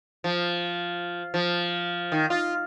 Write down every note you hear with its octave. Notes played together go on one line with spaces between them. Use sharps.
F3
F3
D#3
F4